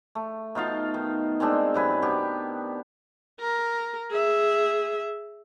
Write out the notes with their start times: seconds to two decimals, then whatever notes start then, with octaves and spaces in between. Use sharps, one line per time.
0.15 A3
0.55 B2 D#4 F4 F5
0.94 D#3
1.40 D#3 G#3 C4 D4
1.74 F#2 C3 B4 G#5
2.02 B2 G4
3.40 A#4
4.10 G#4 E5